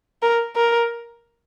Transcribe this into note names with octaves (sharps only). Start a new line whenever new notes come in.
A#4
A#4